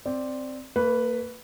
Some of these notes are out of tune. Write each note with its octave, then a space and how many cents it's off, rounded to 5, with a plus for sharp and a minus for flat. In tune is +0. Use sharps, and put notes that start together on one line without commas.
C4 +0 D5 +0
A#3 -40 B4 +0